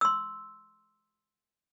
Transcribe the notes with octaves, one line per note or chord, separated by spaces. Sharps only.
C6 E6